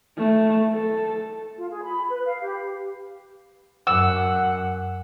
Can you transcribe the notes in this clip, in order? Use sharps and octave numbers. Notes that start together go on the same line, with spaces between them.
A3
A4
F4
G#4
B5
B4
F5
G4
F#2 F#5 E6